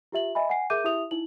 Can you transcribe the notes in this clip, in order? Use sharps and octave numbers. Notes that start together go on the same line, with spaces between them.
F4 G4 E5 F#7
D#5 E5 G#5 B5
F#5 G#5 C7
G#4 A#4 E5 D6 G6 D#7
E4 G4 E5 D#6 F7
D#4 E4 F#7